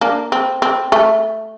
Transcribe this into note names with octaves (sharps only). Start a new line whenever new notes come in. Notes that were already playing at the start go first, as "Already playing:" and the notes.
A#3 D4
C4
C4
A3